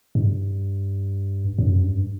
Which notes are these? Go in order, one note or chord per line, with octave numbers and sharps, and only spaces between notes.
G2
F#2
G2